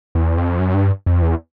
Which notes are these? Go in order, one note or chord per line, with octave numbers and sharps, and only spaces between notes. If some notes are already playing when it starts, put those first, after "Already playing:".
E2
F2
F#2
G2
F2
E2